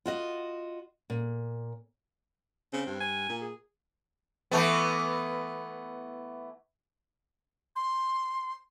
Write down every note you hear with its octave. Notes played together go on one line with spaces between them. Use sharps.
F4 F#4 D#5
A#2
C#3 C4
G2
G#5
A#2
G#4
E3 A3 B3
C6